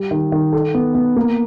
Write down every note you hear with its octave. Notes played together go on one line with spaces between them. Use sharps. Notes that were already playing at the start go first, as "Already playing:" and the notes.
Already playing: G3
D#3
D#3
A4
B3
B3
A#3